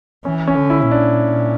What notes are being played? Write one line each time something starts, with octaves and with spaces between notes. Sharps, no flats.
E3 C#4
C#4
D3
E4
A#2
D4